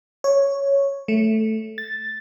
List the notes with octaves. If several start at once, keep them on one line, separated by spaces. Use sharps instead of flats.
C#5
A3
A6